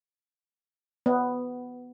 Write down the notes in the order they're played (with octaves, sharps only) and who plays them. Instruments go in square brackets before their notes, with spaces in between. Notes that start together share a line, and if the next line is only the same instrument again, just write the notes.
[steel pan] B3